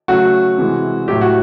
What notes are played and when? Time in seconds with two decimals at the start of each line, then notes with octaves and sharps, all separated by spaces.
0.08 C#3 F#3 A3 F#4
0.58 C3 E3 G#3
1.08 A2 F#3 A3 G4
1.21 F#4